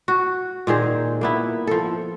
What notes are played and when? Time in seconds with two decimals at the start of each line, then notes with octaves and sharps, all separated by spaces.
0.08 F#4
0.67 A#2 D#3 G#4 C5
1.21 A#3 B3 E4
1.67 F3 A4